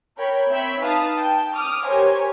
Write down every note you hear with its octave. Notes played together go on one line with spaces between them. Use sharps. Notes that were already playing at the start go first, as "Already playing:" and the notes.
A#4 C#5 G5 B5
C4 C#5 E5 G5 B5
D#4 B4 F5 A5 D#6
G5 A5
D6 D#6 F6
G4 A#4 C5 C#5 G#5